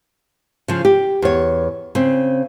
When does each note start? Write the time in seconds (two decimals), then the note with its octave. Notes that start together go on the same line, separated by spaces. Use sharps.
0.68 C#3 F3
0.85 G4
1.22 E2 C#5
1.95 C#3 C4